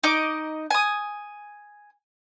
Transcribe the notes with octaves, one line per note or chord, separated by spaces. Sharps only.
D#4 D#5 D6
G#5 D#6